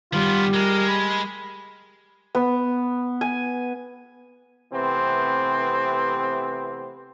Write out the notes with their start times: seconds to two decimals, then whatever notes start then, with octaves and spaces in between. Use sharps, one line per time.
0.13 D#3 G3 B3 F4
0.54 G#3 A#4
0.89 B5
2.35 B3
3.21 G#5
4.72 C3 E3 A3 B3 C4